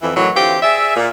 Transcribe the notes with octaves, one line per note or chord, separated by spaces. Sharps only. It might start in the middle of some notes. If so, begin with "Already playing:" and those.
F2 E3
A2 D#3 E3 F#3
D3 E3 C4 F4 G4
G#4 D5 E5
A#2